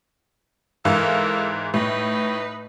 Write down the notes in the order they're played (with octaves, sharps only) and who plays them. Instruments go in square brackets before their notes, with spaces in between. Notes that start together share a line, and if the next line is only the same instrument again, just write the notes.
[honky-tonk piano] G#2 E3 F5 [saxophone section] A4 A#4
[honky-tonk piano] A2 [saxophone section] D#4 B4